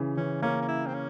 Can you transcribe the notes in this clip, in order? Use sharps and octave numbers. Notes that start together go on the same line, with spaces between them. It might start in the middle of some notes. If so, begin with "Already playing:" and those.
Already playing: C#3 E3
E3 C#4
A#3 C#4
C#4
E4
C4
C#4